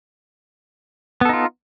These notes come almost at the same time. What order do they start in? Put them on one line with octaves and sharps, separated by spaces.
B3 A4 D#4 F4